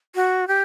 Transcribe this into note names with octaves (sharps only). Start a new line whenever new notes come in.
F#4
G4